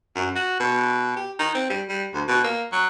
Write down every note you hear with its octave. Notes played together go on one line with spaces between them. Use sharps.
F#2
F#4
B2
G4
D#4
C4
G3
G3
D2
B2
A#3
F#3